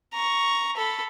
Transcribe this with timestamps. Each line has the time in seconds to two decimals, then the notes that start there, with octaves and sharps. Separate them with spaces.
0.13 A#5 C#6
0.77 A4 B5